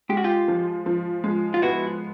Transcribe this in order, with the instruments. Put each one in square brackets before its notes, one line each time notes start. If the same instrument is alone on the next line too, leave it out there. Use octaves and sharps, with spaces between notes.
[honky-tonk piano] G#3 [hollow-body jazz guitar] G4
[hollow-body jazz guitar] F#4
F4 G4
[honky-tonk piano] F3
F3
G#3
[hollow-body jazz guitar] F4
[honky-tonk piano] B3 [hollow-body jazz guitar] E4 F#4